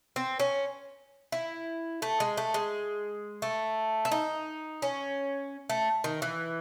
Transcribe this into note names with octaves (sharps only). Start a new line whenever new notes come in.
C4
C#4
E4
A3
G#3
A3
G#3
A3
E4
D#4
C#4
A3
D#3
E3